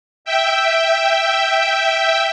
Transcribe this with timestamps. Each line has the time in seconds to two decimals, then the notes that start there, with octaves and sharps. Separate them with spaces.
0.25 E5 G5